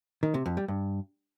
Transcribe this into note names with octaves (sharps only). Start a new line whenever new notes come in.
D#3
C3
F2
G3
G2